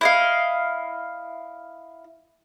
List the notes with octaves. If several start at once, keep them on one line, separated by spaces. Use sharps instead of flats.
E4 D#5 F5